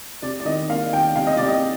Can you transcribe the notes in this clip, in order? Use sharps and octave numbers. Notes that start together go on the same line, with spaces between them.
C3 D5
D5
D#3 D#5
A#3 F5
D#3 G5
C3 F5
D#5
C3 D5
D#5